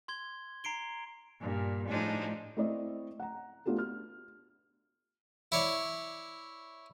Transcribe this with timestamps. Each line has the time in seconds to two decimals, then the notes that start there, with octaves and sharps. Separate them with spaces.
0.08 C6 G#6 G7
0.64 A#5 C7 D7 G7
1.41 G2 A#2
1.88 A2 F3 G#3 D4 D#4
2.57 A3 C4 E4 D5 D#5
3.20 F#5 A#5
3.66 A3 B3 D4 F4 G4 A4
3.78 F6
5.52 E4 C#5 D5